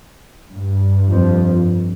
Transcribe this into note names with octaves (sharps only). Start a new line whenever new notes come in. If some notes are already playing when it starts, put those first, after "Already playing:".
G2
F2 F3